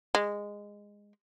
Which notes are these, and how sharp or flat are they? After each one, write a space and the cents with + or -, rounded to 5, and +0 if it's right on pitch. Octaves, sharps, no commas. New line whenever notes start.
G#3 -15